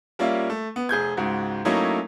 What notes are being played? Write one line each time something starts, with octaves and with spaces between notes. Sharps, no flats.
G3 A#3 C#4 F4 E5
A3
B3
F1 G#4 G6 G#6
C#2 G#2 F#4
F#3 A3 A#3 C#4 D#4 E4